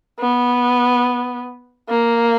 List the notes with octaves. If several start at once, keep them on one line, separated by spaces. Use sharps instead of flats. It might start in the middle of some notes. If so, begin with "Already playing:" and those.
B3
A#3